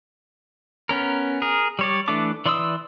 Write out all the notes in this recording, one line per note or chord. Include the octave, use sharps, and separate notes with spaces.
B3 C#4 A#4
G#4 A#4
G3 C#5 D5
E3 A3 D4 A5 D6
E3 D5 C6 D#6 E6